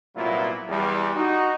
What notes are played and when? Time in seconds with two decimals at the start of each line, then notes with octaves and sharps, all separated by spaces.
0.16 C2 A#2 F#3 B3 E4 F4
0.69 E2 G3
1.16 D#4 F#4